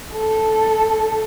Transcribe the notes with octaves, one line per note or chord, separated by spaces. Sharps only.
A4